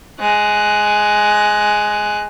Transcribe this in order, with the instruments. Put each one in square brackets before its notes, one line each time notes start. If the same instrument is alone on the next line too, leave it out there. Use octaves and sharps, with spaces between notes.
[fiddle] G#3 F#6